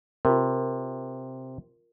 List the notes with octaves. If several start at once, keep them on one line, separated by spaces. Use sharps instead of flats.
C3 F4 A#4